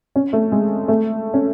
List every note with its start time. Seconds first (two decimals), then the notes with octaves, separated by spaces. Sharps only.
0.16 C#4
0.33 A3
0.52 G#3
0.88 A3
1.34 C#4